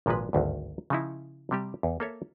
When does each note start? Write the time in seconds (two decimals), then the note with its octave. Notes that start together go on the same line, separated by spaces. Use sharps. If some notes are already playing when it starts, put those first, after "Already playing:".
0.06 G#1 A#2 F3 G#3 B4
0.33 G#1 D2 G2
0.90 C#3 F3 D#4 E4
1.51 C3 G3 G4
1.83 E2
2.00 A#3 A4 C#5 E5